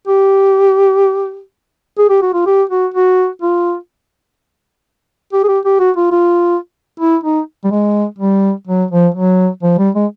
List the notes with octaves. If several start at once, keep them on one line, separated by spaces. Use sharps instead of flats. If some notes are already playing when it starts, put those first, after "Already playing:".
G4
G#4
G4
F#4
F4
G4
F#4
F#4
F4
G4
G#4
G4
G4
F#4
F4
F4
E4
D#4
G3
G#3
G3
F#3
F3
F#3
F3
G3
G#3